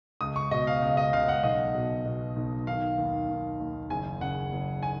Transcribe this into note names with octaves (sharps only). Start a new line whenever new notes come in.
C#2 D#6
C#6
B2 D#5
F5
C#2
D#5
C#2 F5
F#5
B1 D#5
B2
B2
B1
D#3 F5
D#2
D#2
D#2
F#1 G#5
C#3 F#5
F#1
G#5